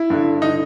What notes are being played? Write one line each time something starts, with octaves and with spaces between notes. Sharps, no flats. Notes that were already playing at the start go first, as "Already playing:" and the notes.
Already playing: E4
G2 D3
D3 D#4